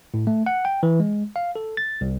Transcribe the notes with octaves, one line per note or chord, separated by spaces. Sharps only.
A2
A3
F#5
G5
E3
G#3
F5
A4
A6
C2